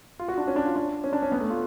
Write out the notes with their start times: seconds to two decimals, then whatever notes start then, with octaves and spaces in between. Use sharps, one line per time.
0.19 F4
0.28 F#4
0.38 D4
0.47 C#4
0.56 D4
0.65 F4
0.76 D4
1.04 C#4
1.13 D4
1.22 C#4
1.32 B3
1.40 A3
1.50 F4